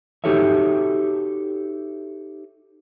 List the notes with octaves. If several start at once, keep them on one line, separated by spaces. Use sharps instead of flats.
D#4 F#4 G4 A4 C#5 E5